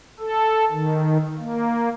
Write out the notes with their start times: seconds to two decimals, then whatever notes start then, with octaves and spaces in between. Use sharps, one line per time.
0.20 A4
0.71 D#3
1.39 A#3